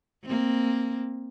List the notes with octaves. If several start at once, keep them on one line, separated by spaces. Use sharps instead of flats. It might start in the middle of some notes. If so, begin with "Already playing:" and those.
A#3 C4